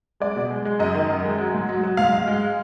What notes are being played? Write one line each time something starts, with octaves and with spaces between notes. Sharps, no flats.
G#3 D5
B2
G#3
G#3
F#2 D#5
D#3
F#2
G#3
F#3
G#2
F#3
F#3
G#2 F5
G#2
G#3